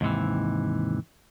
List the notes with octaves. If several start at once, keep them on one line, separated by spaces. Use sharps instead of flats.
D#2 G#2 C3 E3